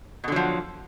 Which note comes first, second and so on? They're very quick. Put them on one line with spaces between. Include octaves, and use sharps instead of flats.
B2 D3 F#3 F3